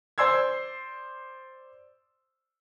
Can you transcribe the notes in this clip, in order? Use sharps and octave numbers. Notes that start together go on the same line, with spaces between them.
C5 D5 C6 E6 G#6